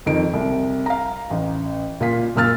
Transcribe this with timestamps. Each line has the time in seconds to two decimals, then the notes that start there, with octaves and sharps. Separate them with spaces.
0.06 F2 D#3 D7
0.33 C2
0.86 F5 A#5
1.30 A1
2.00 A#2 F4 B6
2.35 F#2 A#2 E6 F6 A6